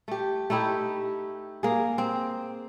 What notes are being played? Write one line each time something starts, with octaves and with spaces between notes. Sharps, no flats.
A3 G4
A3 D#4 E4 G4
A#3 G#4
C4